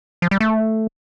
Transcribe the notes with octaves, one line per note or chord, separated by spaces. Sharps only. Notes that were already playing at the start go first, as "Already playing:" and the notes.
F3
G3
A3